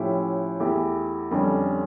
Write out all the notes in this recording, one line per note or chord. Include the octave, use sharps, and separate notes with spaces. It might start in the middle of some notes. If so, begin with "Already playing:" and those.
Already playing: A2 F3 C#4 E4 G4
E2 E3 A3 E4 G4
F2 D3 G3 C#4